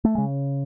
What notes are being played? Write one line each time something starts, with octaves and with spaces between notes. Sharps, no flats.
A3
C#3 G#3